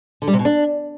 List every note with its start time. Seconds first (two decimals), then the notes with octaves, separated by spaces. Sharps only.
0.22 D3
0.28 G3
0.33 C3
0.39 B2
0.45 D4